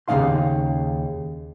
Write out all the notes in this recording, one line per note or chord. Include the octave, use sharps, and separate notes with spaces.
D#2 C#3 B3 D#4 F5 C6